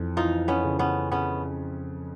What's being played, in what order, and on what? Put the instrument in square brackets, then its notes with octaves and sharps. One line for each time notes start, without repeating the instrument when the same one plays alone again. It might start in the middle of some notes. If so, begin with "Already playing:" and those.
Already playing: [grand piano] F2 E3
[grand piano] E3 [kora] D#4 F4
[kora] B3 C#4
[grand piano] C#3
[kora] B3 C#4
[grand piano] C#3 [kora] B3 C#4